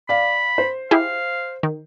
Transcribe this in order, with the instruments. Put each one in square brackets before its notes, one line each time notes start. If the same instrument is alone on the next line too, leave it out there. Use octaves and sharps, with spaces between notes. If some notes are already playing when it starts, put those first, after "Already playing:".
[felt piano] D5 F5 [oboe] B5
[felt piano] C5
[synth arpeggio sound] E4 G4 G#4 [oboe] F5
[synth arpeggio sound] D#3